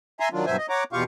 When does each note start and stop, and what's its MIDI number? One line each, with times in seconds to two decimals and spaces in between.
0.20 0.29 76
0.20 0.29 80
0.20 0.29 82
0.20 0.29 84
0.33 0.46 51
0.33 0.46 54
0.33 0.46 62
0.33 0.46 65
0.46 0.56 43
0.46 0.56 47
0.46 0.56 54
0.46 0.56 72
0.46 0.56 76
0.46 0.56 80
0.58 0.66 75
0.69 0.84 73
0.69 0.84 78
0.69 0.84 82
0.69 0.84 86
0.93 1.04 40
0.93 1.04 47
0.93 1.04 65
0.93 1.04 67
0.93 1.04 77
0.93 1.04 85